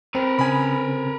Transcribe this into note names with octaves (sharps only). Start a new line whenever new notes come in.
C4 A#4 B4
C#3 G#5 B5